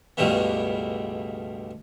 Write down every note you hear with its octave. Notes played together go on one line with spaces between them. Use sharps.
C#2 G2 B2 G3 A3 B3